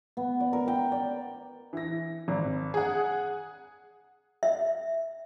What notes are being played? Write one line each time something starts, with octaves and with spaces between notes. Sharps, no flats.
B3
D5
A#4
G5
D5
E3 A#6
G#1
G#4 F#5
E5